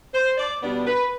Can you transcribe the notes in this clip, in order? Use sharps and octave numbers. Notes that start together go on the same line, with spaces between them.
C5
D5
B2 G3 B3 D4 D5
B4